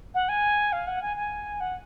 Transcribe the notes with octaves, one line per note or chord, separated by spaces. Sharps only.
F#5
G#5
F5
F#5
G#5
G#5
F#5